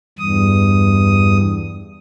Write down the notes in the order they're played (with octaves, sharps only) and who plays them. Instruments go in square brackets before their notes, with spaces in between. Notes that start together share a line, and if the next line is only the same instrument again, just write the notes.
[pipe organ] E2 G2 D#6